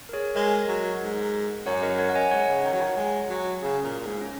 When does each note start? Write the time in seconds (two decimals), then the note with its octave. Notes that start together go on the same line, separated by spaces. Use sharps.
0.09 A#4
0.13 G#4 C#5
0.36 G#3 A#4 D#5
0.68 F#3
1.01 G#2
1.66 F#2 C#5 F#5
1.83 A#4 D#5
1.98 C#5 F#5
2.10 F#5
2.15 D#5 G#5
2.31 G#2 C#5 F#5
2.48 C#3
2.64 D#3
2.73 F#3
2.81 D#3
2.97 G#3
3.29 F#3
3.63 C#3 G#4
3.84 A#2
4.00 A#2
4.06 G#2
4.21 C#4